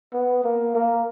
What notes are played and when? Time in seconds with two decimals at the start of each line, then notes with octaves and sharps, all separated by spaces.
0.13 B3
0.44 A#3
0.75 A#3